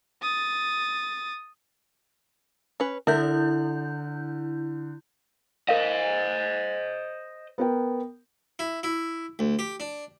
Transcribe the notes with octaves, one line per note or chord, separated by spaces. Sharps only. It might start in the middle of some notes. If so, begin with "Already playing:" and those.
D#6 A6
C#4 B4
D3 E4 A#4 E5 G6
A#4 C5 D#5 F5
B3 A#4 G5
E4
E4
D2
G4
D4